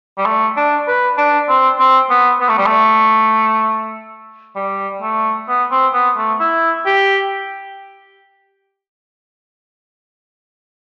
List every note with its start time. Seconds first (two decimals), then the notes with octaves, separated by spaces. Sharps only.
0.18 G3
0.26 A3
0.57 D4
0.88 B4
1.18 D4
1.49 C4
1.79 C4
2.10 B3
2.40 B3
2.49 A3
2.58 G3
2.66 A3
4.56 G3
5.02 A3
5.49 B3
5.71 C4
5.94 B3
6.18 A3
6.40 E4
6.86 G4